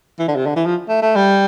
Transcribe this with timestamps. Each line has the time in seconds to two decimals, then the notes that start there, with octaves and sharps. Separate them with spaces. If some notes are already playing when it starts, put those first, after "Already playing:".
0.19 E3
0.28 D3
0.36 C3
0.46 D3
0.56 E3
0.66 F3
0.89 A3
1.02 A3
1.16 G3